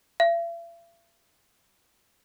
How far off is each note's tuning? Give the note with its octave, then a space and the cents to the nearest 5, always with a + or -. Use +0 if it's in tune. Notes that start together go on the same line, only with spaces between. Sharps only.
E5 +45